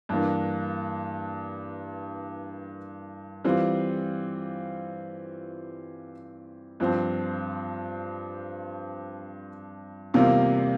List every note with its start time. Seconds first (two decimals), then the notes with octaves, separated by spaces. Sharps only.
0.09 G2 E3 A#3 D4
3.44 E3 G3 C4 F4
6.80 G2 F3 C4
10.14 E2 C3 G3 A#3 F4